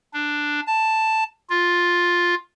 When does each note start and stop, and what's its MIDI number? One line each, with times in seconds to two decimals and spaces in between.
0.14 0.60 62
0.67 1.24 81
1.50 2.35 65